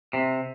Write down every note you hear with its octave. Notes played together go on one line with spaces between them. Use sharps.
C3